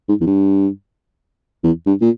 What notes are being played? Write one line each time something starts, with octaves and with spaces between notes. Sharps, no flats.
G#2
E2
G2
E2
G2
A#2